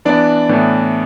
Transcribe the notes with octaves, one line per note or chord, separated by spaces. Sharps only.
E3 B3 D4 D5
A2 E3 B3 D4